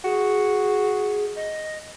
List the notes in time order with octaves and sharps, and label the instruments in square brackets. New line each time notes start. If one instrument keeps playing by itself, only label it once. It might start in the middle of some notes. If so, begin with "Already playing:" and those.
[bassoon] F#4 [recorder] G#4
[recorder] D#5